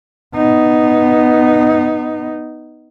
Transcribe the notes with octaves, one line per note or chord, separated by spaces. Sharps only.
B3 D#4